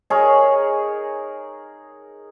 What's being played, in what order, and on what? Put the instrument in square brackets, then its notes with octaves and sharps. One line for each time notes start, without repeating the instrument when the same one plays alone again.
[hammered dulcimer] D#4 G#4 A#4 C#5